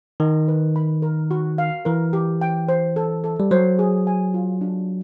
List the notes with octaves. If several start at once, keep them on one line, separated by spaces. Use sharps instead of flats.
D#3 D#5
B4
B5
A#4
F#4
F5
E3 A#4
G4
G5
C5
A4
A4
G3
F#3 C5
G#4
G#5
F4
D4